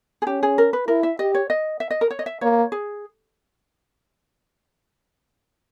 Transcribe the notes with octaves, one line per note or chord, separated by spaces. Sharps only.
G#4
C#4 G4
G#4
A#4
B4
E4 A#4
E5
G4 D#5
C#5
D#5
E5
D#5
A#4
C#5
D#5
E5
A#3 C#5
G#4